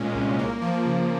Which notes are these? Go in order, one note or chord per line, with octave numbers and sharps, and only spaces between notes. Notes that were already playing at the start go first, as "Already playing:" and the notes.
Already playing: A#2 G#3 C#4
C2
A#3
F3
C#3